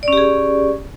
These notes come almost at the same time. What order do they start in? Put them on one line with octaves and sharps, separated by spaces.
D5 C#4 G4 G#4